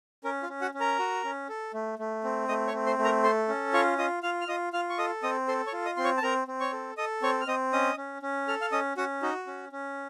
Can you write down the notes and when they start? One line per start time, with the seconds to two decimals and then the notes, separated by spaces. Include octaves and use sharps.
0.24 C#4 A#4
0.43 F4 F5
0.49 C#4
0.61 F#4 F#5
0.74 C#4
0.80 A#4 A#5
0.99 F#4
1.24 C#4
1.49 A4
1.74 A3
1.99 A3
2.24 C4
2.49 A3 D#5 D#6
2.67 C#5 C#6
2.74 C4
2.86 C5 C6
2.99 A3
3.04 A#4 A#5
3.23 A4 C5 C6
3.48 C#4
3.73 F4 C#5 C#6
3.98 F4 D#5 D#6
4.23 F4 F5 F6
4.41 F6
4.48 F4 D#5 D#6
4.73 F4 F5 F6
4.89 C#6
4.98 A4 D#5 D#6
5.23 C4 D#5 D#6
5.48 A4 C5 C6
5.67 C#5 C#6
5.73 F4
5.86 D#5 D#6
5.96 C4 C6
6.04 C#5 C#6
6.17 A5
6.22 C4 A#4 A#5
6.48 C4
6.60 C#5 C#6
6.73 A4
6.97 A4 D#5 D#6
7.22 C4 C#5 C#6
7.41 F6
7.47 C4 D#5 D#6
7.73 C#4 D#5 D#6
7.97 C#4
8.22 C#4
8.48 A4 F6
8.61 F5 F6
8.72 C#4 D#5 D#6
8.97 C#4 F#4 F#5
9.22 D#4 F#4 D#5
9.47 C#4
9.72 C#4